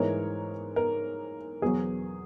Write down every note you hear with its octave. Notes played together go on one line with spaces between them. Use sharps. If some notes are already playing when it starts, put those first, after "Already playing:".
Already playing: G#2 E3 G#3 A#4 C#5
A#4
E2 B2 F#3 G#4